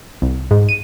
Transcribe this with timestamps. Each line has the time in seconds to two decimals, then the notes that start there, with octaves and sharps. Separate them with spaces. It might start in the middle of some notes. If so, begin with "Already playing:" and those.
0.22 C2
0.51 G#2
0.69 D#7